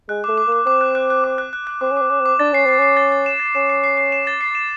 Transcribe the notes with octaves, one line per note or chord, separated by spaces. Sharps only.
G#3 F#6
D6
A3
D6
A#3
D6
C4 D6
F#6
F#6
F#6
D6
F#6
F#6
F#6
C4 D6
C#4
D6
C4
C#4 D6
C4
D6
D4 A6
C#4 C7
C4 C7
C#4 C7
A6
A6
E7
A6
C#4 E7
C7
C7
C7
E7
A6
C7
E7